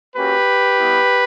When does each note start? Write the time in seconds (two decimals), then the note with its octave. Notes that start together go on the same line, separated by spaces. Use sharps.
0.16 A#3 C#4 F#4 G4 B4
0.78 G3 B3 E4